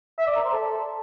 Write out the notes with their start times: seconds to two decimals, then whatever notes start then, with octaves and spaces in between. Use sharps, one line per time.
0.19 E5
0.27 D5
0.36 A#4
0.44 C5
0.53 A4